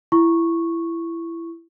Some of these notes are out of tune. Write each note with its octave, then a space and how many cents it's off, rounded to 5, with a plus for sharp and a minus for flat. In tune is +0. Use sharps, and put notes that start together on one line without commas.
E4 +20 C#6 -10